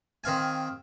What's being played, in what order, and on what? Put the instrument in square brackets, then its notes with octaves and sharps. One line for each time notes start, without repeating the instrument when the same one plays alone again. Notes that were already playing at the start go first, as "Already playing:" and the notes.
[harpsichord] D#3 C4 F5 G#5